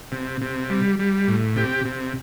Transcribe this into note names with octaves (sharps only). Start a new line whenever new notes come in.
C3
C3
G3
G3
A2
C3 G4
C3